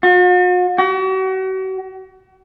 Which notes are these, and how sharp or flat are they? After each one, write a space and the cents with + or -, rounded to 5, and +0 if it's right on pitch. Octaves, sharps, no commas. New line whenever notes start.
F#4 -45
F#4 +40